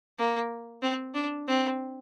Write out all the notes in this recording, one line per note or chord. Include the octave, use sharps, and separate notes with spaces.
A#3
C4
D4
C4